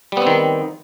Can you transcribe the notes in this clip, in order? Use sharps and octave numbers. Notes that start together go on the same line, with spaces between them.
D#3 G3 B3 C4